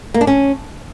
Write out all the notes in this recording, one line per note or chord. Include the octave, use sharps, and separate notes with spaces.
A#3
D4
C#4